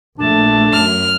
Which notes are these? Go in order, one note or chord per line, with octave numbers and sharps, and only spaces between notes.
A#1 A3 D4 A5
F#2 F6